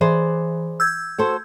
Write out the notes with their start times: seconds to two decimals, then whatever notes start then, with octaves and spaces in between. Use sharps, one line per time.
0.01 E3 G#4 C5 D5
0.80 E6 G6 G#6
1.18 F#4 A4 C5